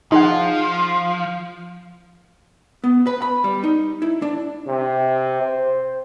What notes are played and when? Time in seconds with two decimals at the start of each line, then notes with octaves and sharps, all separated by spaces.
0.12 F3 D#4 G#4 F#5
2.84 B3
3.07 B4
3.22 B5
3.44 G3
3.64 D#4
4.02 E4
4.22 D4
4.67 C3
5.41 C5